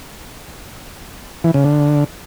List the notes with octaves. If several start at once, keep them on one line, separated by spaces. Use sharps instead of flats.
E3
C#3
D3